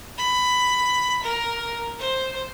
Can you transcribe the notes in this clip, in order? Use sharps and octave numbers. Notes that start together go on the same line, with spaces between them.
B5
A#4
C5